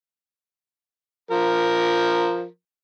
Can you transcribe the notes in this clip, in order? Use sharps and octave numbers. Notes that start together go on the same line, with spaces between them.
F3 A#4